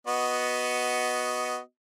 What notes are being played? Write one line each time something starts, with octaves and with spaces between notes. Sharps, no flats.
B3 F#4 D#5